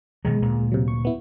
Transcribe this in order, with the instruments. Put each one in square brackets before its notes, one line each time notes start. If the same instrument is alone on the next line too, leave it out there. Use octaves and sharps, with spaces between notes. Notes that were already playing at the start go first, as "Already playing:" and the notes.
[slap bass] B2 D#3 F#3 [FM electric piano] G#3
[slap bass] D2 A#2
[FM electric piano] C3 F#3
C#6
B3 E4